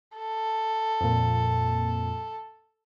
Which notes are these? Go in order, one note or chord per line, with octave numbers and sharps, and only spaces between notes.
A4
F2 A#2